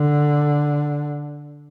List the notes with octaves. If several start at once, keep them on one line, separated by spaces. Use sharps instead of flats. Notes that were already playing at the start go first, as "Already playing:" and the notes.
Already playing: D3